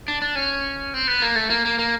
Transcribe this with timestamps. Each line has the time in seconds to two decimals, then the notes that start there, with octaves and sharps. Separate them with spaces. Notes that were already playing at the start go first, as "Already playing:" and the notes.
0.08 D4
0.22 D4
0.35 C#4
0.94 C4
1.07 B3
1.22 A#3
1.36 A3
1.50 A#3
1.65 A#3
1.79 A#3